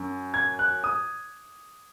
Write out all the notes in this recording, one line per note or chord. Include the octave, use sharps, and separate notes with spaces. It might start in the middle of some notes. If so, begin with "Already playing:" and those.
Already playing: F#2
G#6
F#6
D#6